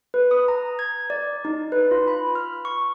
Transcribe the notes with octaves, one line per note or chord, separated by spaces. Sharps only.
B4
D#6
A#5
G#6
D5
D#4
B4
F4
B5
F6
C#6